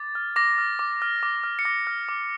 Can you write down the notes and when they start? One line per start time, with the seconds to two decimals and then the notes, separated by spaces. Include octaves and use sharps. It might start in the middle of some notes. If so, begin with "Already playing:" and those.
Already playing: D6 A6
0.15 F6
0.36 D6 A#6
0.58 F6
0.79 D6
1.02 F6
1.23 D6
1.44 F6
1.59 C#7
1.65 D6 A#6
1.87 F6
2.09 D6